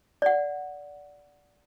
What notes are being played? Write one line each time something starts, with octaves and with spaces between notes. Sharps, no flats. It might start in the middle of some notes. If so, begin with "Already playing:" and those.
D5 F#5